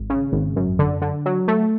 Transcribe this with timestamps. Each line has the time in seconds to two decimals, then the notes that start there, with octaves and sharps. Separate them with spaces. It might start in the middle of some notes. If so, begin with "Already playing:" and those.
Already playing: G#1
0.10 C#3
0.32 G#1
0.56 F#2
0.79 D3
1.02 D3
1.26 F#3
1.48 A3